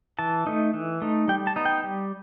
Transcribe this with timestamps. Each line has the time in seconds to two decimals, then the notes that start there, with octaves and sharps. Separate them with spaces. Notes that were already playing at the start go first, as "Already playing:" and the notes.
0.19 E3 A5
0.47 A3 D#4
0.74 E3
1.02 A3 D#4
1.28 G3 G5
1.47 A5
1.56 B3 D#4
1.65 G5
1.84 G3